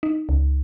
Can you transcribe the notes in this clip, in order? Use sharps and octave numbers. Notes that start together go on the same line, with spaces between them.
D#4
C#2